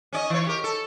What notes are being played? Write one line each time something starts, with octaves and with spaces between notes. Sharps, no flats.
C#4 D5 D#5
E3 C#5
G4 A#4
A4